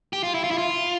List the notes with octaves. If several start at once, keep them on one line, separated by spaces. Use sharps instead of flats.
G4
F4
E4
F4
E4
F4